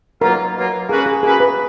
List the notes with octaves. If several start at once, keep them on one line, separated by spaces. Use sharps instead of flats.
B2 F#3 A#3 F4 A#4
B2 F#3 A#3 F4
A#3 C#4 F#4 G#4 B4
G#4
A#3 C#4 F#4 G#4 B4
B4